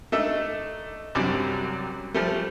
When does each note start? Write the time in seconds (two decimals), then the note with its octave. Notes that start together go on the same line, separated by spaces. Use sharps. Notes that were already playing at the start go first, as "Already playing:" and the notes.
0.12 A3 D4 D#4 E5
1.15 C2 F#2 G3 D4 D6
2.14 F3 G3 A3